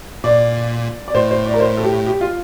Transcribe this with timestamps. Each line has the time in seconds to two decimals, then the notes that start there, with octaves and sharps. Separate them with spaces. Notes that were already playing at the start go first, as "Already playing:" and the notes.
0.24 A#2 D5
1.08 D5
1.14 A2 C5
1.31 C5
1.46 D5
1.54 A#4
1.60 C5
1.77 A4
1.83 G4
2.07 G4
2.21 F4